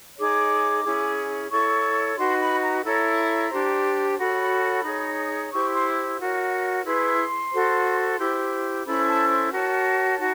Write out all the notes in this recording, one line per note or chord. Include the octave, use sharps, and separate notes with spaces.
D#4 G#4 C#5 D6
C#4 E4 G#4
E4 A4 C#5 C#6
D#4 F#4 B4 C6
B5
A#5
E4 A4 C#5 A#5
D4 G4 C5
F#4 A4 C#5 B5
D#4 G#4 C#5
E4 G4 C5 C#6
C6
F#4 A#4 C#5
E4 G#4 B4 C6
F#4 A4 C5
E4 G4 C5
C#4 E4 A4 C5 B5
A5
F#4 A#4 C#5 A5
D#4 F#4